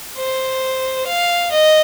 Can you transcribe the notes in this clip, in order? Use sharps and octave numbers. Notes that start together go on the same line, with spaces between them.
C5
F5
D#5